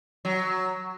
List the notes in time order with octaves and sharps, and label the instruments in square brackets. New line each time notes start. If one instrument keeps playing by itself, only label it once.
[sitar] F#3